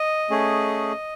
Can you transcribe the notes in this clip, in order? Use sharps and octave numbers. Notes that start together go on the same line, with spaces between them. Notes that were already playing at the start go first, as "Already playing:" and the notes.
Already playing: D#5
A3 C#4 G#4